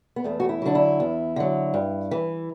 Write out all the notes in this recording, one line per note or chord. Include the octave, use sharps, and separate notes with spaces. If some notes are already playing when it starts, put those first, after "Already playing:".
B3
E2 A3
F#4
E4
D3 F#3 D4
E4
E2
D3 F#3
G2
E3